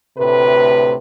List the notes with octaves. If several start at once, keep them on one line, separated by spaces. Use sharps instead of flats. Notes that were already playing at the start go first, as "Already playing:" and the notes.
D2 A2 C3 B4